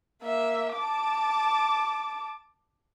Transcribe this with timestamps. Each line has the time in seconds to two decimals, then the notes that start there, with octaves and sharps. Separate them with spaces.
0.22 A#3 E5
0.74 A5 D6